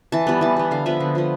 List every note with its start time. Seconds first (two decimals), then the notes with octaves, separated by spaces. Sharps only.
0.12 E3 A5
0.27 G3 B3
0.41 E3 A5
0.57 G3 B3
0.71 D3 F5
0.86 F3 B3 E5
1.00 D3
1.15 F3 B3